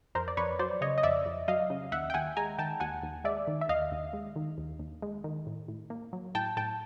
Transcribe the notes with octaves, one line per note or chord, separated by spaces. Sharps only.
F2 A#4 C5
D5
F2 B4 C#5
F#3 C5 D5
C#3 C#5 D#5
D#5
F2 D5 E5
F2
F#3 D#5 F5
C#3
D#2 E5 F#5
G5
D#2 F#5 G#5
G#3 G#5 A#5
D#3 G5 A5
D#2 F#5 G#5
D#2
G#3 D5 E5
D#3
E5
D#2 D#5 F5
D#2
G#3
D#3
D#2
D#2
G#3
D#3
A2
A2
A#3
F#3
A2 G5 A5
A2 G5 A5